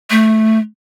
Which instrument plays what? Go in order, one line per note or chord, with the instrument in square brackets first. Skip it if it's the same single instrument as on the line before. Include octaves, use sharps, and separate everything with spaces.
[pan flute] A3